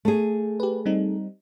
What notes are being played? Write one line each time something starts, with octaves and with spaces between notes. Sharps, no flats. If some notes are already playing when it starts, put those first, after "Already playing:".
A3 G#4
G4 B4
G3 C4 D#4